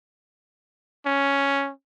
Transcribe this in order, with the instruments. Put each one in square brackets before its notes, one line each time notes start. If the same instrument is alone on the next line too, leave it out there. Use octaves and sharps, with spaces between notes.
[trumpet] C#4